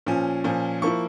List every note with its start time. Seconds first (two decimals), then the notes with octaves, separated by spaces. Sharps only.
0.06 A#2 F3 C#4
0.44 A#2 F3 C#4
0.82 F3 A#3 E4 C#6